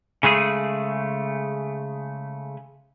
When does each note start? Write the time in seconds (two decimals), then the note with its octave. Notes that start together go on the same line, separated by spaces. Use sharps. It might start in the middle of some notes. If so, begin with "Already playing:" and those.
0.23 C#3 G#3 A3 G#4